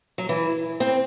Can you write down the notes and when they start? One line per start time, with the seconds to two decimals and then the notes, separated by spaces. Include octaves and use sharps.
0.18 F#3
0.29 E3
0.80 C4